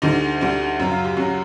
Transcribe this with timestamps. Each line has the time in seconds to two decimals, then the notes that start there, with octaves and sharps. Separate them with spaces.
0.02 D2 D3 G3 D#4
0.41 D2 D3 G3
0.80 F#2 C#3 F#3
0.91 F4
1.05 G4
1.17 F#2 C#3 F#3 F#4